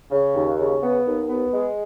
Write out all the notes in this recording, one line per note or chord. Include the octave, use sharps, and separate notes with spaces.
C#3
D#2
C#3
B3
D#2
B3
G#3